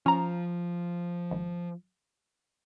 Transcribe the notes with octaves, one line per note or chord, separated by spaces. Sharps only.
F3 C#4 A#5
G#1